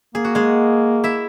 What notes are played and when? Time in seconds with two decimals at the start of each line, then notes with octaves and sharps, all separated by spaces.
0.15 A#3 G#4
0.25 F#4
0.35 G#3 G#4
1.04 E4 E5